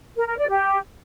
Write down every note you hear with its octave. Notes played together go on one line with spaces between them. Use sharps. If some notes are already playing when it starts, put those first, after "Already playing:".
A#4
A#4
D5
G4